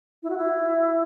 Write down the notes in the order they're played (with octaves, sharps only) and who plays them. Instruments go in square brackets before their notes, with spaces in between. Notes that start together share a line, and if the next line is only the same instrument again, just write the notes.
[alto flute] E4
F#4
E4